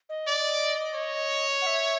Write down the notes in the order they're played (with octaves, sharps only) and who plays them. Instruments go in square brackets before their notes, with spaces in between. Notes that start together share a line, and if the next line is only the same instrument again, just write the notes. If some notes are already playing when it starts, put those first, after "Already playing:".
[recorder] D#5
[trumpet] D5
C#5
[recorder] F#5
E5